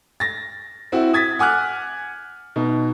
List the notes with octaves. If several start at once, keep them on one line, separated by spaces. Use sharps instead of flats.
A6 A#6
C4 E4 F#4
D#6 G#6 A6 B6
F#5 G#5 D6 F6 F#6
B2 D#4